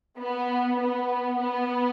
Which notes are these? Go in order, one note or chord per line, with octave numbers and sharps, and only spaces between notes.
B3
B3
B3